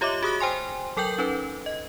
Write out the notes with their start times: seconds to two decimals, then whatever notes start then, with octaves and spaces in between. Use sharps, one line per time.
0.01 F4 G4 C#5 D#5 E5 D6
0.23 F#4 G#4 D#6 F#6 A#6
0.40 C5 G5 G#5 C6
0.97 F#3 A4 A#4 G5 G6 F#7
1.18 C#4 D#4 A4 B4
1.66 D#5